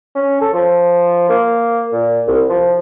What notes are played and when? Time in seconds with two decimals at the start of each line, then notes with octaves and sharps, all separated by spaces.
0.15 C#4
0.41 A4
0.54 F3
1.29 A#3
1.93 A#2
2.27 C2
2.50 F3